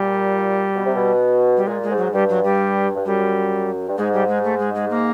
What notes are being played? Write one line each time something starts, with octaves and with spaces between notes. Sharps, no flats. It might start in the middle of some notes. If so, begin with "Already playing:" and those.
Already playing: A#2 G3
B2
C3
B2
G3
A#2 G#3
G#3
G#2
F#3
G2 G3
F#3
G3
G2
F#2 G3
G2
G#2 G#3
G3
G#3
A3
G#3
G#3
A#3